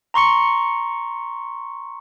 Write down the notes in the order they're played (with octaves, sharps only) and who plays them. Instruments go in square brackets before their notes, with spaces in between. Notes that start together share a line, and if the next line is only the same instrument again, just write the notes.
[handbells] A#5 C6 C#6 C#7